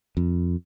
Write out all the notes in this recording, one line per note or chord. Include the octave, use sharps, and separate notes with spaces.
F2